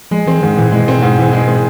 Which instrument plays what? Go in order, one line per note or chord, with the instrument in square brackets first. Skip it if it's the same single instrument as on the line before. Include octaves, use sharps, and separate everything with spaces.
[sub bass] F3 [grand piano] G#3
[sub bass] E3 [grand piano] C4
[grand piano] G#2 [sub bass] D#3
[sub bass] A#2 [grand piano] E3
[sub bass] B2 [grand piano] G#3
[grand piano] C4
G#2
E3
G#3
C4